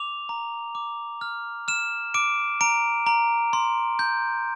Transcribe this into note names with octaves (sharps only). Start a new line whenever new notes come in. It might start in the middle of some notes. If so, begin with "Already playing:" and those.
Already playing: D6 F7
A#5
D6
F6
F6 E7
D6 D7
A#5 D7
A#5
C6
G6